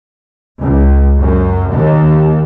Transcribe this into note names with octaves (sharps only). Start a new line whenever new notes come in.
C#2
F#2
D#2